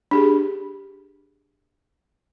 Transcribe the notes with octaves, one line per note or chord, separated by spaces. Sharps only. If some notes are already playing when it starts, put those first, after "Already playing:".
D4 G4 G#4